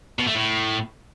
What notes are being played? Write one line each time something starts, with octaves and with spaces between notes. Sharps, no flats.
B2
A3
A2